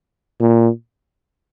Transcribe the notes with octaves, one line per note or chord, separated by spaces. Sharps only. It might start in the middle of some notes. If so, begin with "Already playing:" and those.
A#2